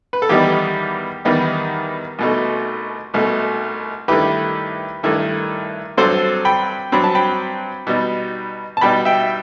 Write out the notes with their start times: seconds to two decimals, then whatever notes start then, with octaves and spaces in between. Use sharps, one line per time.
0.13 B4
0.22 A4
0.29 E2 D#3 G3 B3 D#4 G4
1.25 E2 D#3 G3 B3 D#4
2.19 C2 B2 A3 D#4
3.14 C2 B2 A3 D#4
4.08 G2 D#3 A3 E4 G4 B4
5.03 G2 D#3 A3 E4
5.97 G2 F#3 C4 A4 C5
6.45 G5 B5
6.92 G2 F#3 C4 B5
7.04 A5
7.15 G5 B5
7.87 B2 G3 D#4
8.77 A5
8.81 B2 G3 D#4 G5 B5
9.05 E5 G5